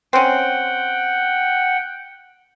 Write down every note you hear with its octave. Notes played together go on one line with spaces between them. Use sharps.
C4 C#4 F#5 G5